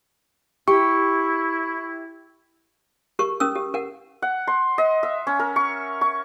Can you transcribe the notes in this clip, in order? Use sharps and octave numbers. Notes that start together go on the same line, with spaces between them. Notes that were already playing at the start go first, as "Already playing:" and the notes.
E4 G4 C#6
G4 A#4 C#6
C#4 A#4 D#6 E6
G4
A#4 F#5
F#5
C6
D#5
E5
C#4
A#4
C#6
C#6